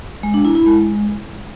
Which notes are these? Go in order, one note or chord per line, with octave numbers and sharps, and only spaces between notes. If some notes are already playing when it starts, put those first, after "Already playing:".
G#3
D4
E4
E4
G#3